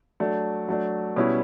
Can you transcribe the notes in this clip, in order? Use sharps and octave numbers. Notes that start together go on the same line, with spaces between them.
F#3 A3 D4
F#3 A3 D4
B2 G3 C#4 E4